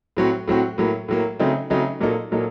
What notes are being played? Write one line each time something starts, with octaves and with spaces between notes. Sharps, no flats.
A2 F#3 C4 F#4
A2 F#3 C4 F#4
A2 F#3 A#3
A2 F#3 A#3
C#3 F#3 A3 C4 D#4
C#3 F#3 A3 C4 D#4
A#2 F#3 A#3 D#4 A4
A#2 F#3 A#3 D#4 A4